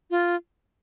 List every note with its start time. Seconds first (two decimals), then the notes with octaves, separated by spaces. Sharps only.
0.11 F4